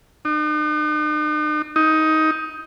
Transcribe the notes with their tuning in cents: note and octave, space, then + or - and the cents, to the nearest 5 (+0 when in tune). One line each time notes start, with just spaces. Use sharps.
D#4 -45
D#4 +15